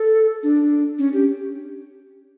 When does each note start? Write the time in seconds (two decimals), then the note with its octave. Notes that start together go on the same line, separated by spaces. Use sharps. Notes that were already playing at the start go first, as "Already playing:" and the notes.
Already playing: A4
0.43 D4
0.99 C#4
1.13 G4